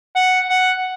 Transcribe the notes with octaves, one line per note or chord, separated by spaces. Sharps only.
F#5
F#5